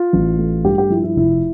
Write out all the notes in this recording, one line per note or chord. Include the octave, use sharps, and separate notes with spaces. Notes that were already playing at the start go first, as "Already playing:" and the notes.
Already playing: F4
A1
A3
G2 G4
G4
F3 E4
E4
F1 E4